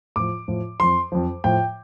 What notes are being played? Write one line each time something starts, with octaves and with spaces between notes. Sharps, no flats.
A2 F3 D6
A2 F3
F2 F3 C6
F2 F3
A2 F3 G5